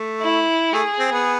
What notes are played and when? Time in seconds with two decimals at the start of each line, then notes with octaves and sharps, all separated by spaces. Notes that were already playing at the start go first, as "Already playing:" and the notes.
Already playing: A3
0.22 E4
0.73 A3 G#4
0.99 C4
1.12 B3